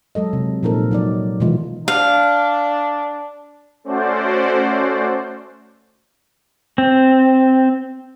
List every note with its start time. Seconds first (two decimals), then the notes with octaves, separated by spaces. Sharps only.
0.15 F#3 G#3 A4 D#5
0.33 C3
0.63 A#2 F3 D#4 A4 A#4
0.91 F#3 D#4 D5
1.40 B2 D#3 E3 G#3 F4
1.88 D4 F5
3.84 A3 C#4 F#4 C5 D5
6.78 C4